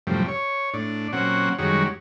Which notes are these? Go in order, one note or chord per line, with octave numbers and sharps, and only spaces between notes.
F#2 A2 C3 F3 G3
C#5
A2 D4
A#2 F#3 C4 C#4 F#5
F#2 D#3 G3 G#3 F#4 C#5